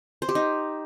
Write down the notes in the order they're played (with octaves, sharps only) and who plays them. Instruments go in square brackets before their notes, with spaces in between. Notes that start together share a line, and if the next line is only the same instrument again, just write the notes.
[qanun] C5
G4
D#4